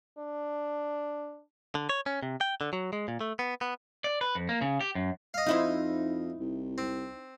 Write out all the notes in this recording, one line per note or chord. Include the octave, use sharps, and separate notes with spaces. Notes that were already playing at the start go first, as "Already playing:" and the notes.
D4
D3
C#5
C#4
C3
G5
D3
F#3
G#3
A#2
A3
B3
B3
D5
B4
F2
A#3
C#3
G4
F#2
D#5 F5
F2 D#4 E4 C5
C2
C4